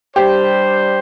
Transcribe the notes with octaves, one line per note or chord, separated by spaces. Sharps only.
G3 D4 G4 C5